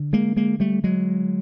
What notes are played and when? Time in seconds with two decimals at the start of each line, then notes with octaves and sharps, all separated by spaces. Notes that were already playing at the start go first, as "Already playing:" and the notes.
Already playing: D3
0.13 G#3 A#3
0.37 G#3 A#3
0.60 G3 A3
0.84 F#3 G#3